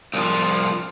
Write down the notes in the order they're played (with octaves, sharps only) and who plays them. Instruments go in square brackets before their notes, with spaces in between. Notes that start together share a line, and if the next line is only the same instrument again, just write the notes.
[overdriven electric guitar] C2 F3